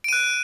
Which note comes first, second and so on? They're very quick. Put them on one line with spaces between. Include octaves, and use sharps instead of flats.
D7 D#7 F#6